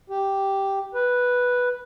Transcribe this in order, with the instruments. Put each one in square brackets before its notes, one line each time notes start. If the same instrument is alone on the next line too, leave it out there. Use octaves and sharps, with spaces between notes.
[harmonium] G4
B4